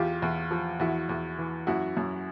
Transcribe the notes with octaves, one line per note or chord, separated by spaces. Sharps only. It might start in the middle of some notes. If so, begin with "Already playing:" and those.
Already playing: E2 F4 G4
E2
F3
E2 E4 F#4
E2
E3
F#2 E4 F#4
F#2